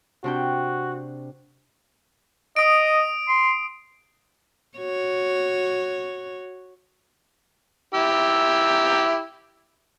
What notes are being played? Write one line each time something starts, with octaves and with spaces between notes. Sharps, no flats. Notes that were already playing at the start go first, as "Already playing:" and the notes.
C3 D4 F#4 G5
D#5 D#6 D7
C6
F#4 C#5
E4 G4 E6